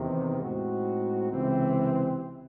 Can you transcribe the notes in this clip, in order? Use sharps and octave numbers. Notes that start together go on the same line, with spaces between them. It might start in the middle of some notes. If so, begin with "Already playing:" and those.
Already playing: E2 C3 D#3
A2 G#3 C4 D#4 F#4
C#2 C3 E3 C4